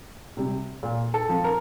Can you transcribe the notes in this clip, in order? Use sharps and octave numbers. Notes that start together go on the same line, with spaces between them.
C3 G3
A#2
A4
F3 C4
A#4